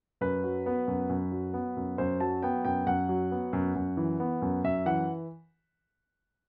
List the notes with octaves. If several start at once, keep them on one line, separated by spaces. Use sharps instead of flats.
F#2 B4
F#3
B3
F#2
F#2
F#3
B3
F#2
F#2 C5
F#3 A5
B3 G5
F#2 G5
F#2 F#5
F#3
B3
F#2
F#2
E3
B3
F#2
F#2 E5
E3 F#5